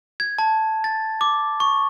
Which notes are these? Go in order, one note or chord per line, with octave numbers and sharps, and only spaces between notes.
G#6
A5
A6
D6
C#6